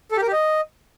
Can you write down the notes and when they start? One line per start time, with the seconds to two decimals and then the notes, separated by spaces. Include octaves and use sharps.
0.12 A4
0.17 G4
0.22 A#4
0.27 G4
0.33 D#5